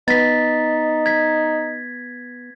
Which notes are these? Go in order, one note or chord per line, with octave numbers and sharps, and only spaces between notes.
B3 D#4 A6 B6
G#6 B6